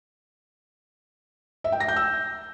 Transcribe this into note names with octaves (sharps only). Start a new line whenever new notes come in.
E5
G5
A#6
G6
E6